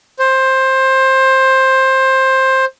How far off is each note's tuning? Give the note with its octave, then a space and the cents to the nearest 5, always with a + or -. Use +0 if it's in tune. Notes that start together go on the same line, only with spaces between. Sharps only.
C5 +15